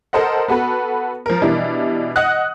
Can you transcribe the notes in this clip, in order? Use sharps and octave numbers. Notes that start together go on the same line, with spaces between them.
A4 A#4 C5 D#5 F#5
B3 F#4 A4 B4
F3 A#4
B2 E3 G3 D4 E4
D#5 F#5 D#6 F#6